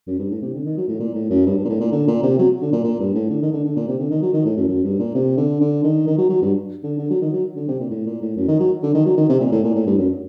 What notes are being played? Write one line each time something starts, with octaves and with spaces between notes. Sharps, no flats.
F#2
G2
A2
C3
D3
D#3
F#3
A2
A#2
A2
F#2
G2
G2
A#2
A2
A#2
D3
A#2
C3
F#3
D3
A#2
A#2
G2
A2
D3
D#3
D3
D3
A#2
C3
D3
D#3
F#3
D#3
A2
F#2
F#2
G2
A#2
C3
D3
D3
D#3
D#3
F#3
F#3
G2
D3
D3
F#3
D#3
F#3
D3
C3
A#2
A2
A#2
A2
F#2
D#3
F#3
D3
D#3
F#3
D#3
C3
A#2
A2
A#2
A2
G2
F#2